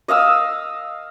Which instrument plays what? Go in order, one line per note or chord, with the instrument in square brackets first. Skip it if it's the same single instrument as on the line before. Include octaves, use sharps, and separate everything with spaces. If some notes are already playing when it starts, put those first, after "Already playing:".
[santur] D#5 F5 D#6 E6